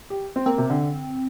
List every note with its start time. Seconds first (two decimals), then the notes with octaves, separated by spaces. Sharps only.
0.10 G4
0.36 C4
0.46 A#3 C4
0.58 C3
0.70 D3